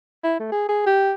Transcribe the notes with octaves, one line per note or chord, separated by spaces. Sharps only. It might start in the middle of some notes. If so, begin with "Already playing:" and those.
E4
A3
G#4
G#4
G4